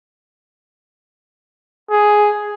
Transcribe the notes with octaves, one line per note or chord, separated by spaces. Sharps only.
G#4